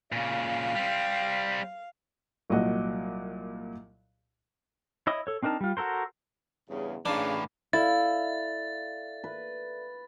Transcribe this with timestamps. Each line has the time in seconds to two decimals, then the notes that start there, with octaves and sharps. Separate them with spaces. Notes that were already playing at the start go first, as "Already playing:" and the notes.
0.12 A#2 C#3 F5
0.75 G3 C4
2.50 C2 A#2 F#3 D#5 F#5
5.07 E4 C#5 D#5 D#6
5.27 A4 C#5
5.43 C4 D4 D#4 A#4 A5
5.61 G3 F4
5.77 F#4 A4 A#4 C5
6.69 E2 G2 C#3
7.06 A2 C#3 E3 D4 D#4 D5 F5
7.73 E4 A4 D5 E5 F5 A6
9.24 B4